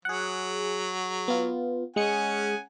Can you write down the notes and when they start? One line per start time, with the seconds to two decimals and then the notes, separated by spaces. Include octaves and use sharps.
0.05 F#3 G#4 F#5
1.28 B3 F4
1.96 G#3 C#4 F#5 G#5 D#6 C#7